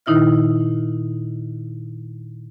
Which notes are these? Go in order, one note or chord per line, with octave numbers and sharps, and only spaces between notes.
A#2 D#3 D#4 E4 E5 F6